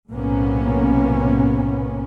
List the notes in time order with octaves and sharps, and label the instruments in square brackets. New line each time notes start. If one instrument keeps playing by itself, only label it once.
[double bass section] B1 A2 C3 A#3 B3 C#4